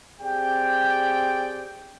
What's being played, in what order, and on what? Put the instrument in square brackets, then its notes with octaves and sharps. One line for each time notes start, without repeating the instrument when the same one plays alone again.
[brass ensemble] C4 G4 G#4 D5 G5